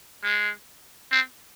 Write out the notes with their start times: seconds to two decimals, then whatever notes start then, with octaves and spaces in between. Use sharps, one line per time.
0.23 G#3
1.11 C4